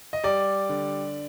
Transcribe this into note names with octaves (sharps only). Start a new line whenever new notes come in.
D#5
G3 D5
D3